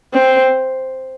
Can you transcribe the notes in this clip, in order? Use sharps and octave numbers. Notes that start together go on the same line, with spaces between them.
C4